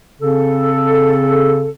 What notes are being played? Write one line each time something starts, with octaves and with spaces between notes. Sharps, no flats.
C#3 C4 A4